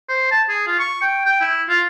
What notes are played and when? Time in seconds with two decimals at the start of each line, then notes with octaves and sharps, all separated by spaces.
0.09 C5
0.31 A5
0.49 G#4
0.67 F4
0.79 C#6
1.02 G5
1.26 G5
1.41 E4
1.69 F4